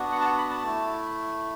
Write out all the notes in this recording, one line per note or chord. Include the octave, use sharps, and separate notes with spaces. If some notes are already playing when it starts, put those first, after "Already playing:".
Already playing: B3 D4 F#4
F#5
A5
F#5
B5
A5
A3 E4